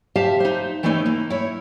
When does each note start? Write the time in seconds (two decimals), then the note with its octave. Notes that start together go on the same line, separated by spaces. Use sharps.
0.16 G4 C5 E5 F5 A5
0.40 D#4 C5
0.83 E3 A3 A#3 C#4 D#4 E4
1.06 A#3
1.30 E4 C#5